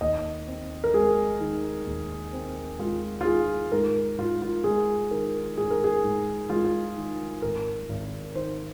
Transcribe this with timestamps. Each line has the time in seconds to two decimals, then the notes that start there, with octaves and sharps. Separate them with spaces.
0.01 D#2 D#5
0.48 C4
0.84 A#4
0.94 G#3 G#4
1.40 D#3
1.86 D#2
2.33 C4
2.79 G#3 F4
3.21 F4
3.25 D#3 G#4
3.72 G#2 A#4
4.18 G#2 F4
4.42 F4
4.64 G#3 G#4
5.11 D#3 A#4
5.58 G#2 G#4
5.71 A#4
5.84 G#4
6.04 G#2
6.50 G#3 F4
6.64 F4
6.96 D#3
7.42 G#1 A#4
7.89 G#1
8.35 D#3 C5